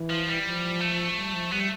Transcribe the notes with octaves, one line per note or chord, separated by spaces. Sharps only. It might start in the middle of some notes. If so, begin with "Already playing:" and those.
Already playing: E3
F3
G3
F3
A3
G3
F3
G3 B3
A3